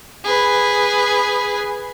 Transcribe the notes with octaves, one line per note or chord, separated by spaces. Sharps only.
G#4 B4